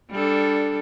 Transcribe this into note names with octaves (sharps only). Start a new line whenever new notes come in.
G3 D4 A4